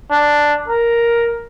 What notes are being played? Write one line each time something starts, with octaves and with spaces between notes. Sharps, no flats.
D4
A#4